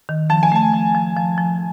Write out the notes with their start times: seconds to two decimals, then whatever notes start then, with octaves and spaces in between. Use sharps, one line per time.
0.09 D#3
0.30 F3 A5
0.43 G#5
0.52 A3 A5
0.73 F3
0.95 F3
1.16 F3
1.38 F3